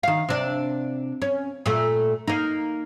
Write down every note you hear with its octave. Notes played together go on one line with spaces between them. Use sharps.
D#3 F5
C3 D4
C#4
A#2 A3
A#3 D#4